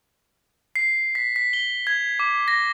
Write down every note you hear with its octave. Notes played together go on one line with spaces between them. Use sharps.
C7
B6
B6
G7
G#6
D6
A#6